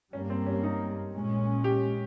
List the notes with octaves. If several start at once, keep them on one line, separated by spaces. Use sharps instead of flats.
G2 G3 A#3 C#4
C4
C#4
D#4
A#2 G#3 C#4
G4